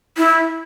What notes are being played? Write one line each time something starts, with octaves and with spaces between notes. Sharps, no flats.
E4